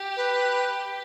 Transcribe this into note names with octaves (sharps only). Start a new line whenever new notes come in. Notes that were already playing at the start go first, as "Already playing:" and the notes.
Already playing: G4
B4